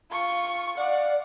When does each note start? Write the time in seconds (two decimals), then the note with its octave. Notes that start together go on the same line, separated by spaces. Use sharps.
0.11 F4 C#6
0.77 D5 F5 F#5